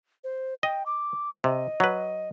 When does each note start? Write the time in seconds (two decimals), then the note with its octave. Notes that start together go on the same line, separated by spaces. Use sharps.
0.24 C5
0.63 D#5 G5
0.86 D6
1.44 C3 D#5
1.80 F#3 B4